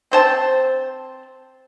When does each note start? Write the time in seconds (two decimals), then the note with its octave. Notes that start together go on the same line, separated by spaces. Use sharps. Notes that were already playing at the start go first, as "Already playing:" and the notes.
0.12 C4 C5 A5